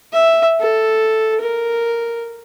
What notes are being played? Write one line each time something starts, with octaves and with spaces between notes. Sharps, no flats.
E5
A4
A#4